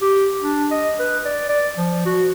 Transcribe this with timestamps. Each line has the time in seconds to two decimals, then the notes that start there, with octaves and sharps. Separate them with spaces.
0.01 G4
0.40 D4
0.71 D#5
0.99 B4
1.25 D5
1.49 D5
1.77 F3
2.06 F#4